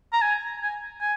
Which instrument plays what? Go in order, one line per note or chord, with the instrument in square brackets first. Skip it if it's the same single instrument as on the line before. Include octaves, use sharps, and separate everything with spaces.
[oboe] A#5
G#5
G#5
G#5